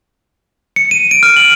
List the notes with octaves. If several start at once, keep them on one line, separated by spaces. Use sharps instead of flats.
C#7
D#7
D7
F6
F#7